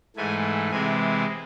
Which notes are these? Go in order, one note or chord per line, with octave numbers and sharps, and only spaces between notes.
G#2 E3 A3 G#5
C3 E3 G#3 C4 G#5